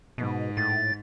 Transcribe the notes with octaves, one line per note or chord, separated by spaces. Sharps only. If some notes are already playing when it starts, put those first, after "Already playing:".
G#2 B2
A2 A6